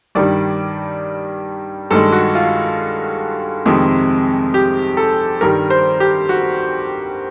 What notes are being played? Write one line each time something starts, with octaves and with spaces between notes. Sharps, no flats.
G2 D#3 G3 D5
G2 D#3 G#3 A4
F#4
F4
F2 C3 D#3 G#3
G4
A4
G2 D#3 G3 A#4
C5
G4
F#4